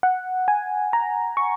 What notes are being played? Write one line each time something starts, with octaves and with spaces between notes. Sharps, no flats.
F#5
G#5
A#5
C#6